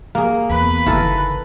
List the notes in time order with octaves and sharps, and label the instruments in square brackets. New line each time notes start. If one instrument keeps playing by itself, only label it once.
[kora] A#3 G#4
[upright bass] E2 [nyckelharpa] B4 B5
[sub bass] F#1 [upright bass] D3 D#4 [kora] E3 A4 A#4